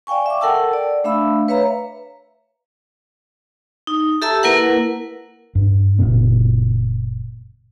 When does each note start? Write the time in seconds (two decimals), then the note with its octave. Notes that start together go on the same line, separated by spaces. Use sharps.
0.07 D5 F5 G5 G#5 C#6
0.26 E5 D6
0.41 A4 A#4 F#5 G5 A5 E6
0.73 D5
1.04 A3 D4 E5 F5 B5 E6
1.48 B4 C#5 E5 F5 A#5
3.87 D#4
4.22 G4 A4 E5 A5 A#5 E6
4.43 A#3 E4 A#4 B4 F#5
5.55 G2
5.99 F#1 F2 A#2 B3